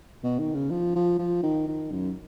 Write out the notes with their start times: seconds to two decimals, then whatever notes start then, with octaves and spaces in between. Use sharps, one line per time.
0.24 B2
0.39 D#3
0.54 C#3
0.71 F3
0.96 F3
1.19 F3
1.43 D#3
1.68 D#3
1.92 F#2